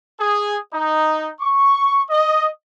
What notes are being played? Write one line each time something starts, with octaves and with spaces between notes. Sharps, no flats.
G#4
D#4
C#6
D#5